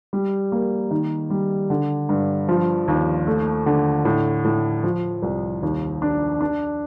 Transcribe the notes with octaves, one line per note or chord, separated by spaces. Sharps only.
G3
A#3
D#3
G3
D3
G2
F3
D#2
A3
D3
A2
A2
F3
C2
D#2
D4
D4